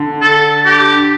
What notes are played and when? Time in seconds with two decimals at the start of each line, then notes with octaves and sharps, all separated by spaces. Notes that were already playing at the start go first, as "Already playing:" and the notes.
Already playing: D3
0.21 A4
0.65 G4